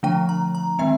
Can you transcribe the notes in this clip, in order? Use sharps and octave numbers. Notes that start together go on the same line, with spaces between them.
D3 F3 A3 D4 G5
A#5
A#5
D#3 G#3 C4 E5